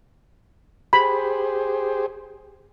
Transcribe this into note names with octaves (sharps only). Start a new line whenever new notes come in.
G4 G#4 C5 B5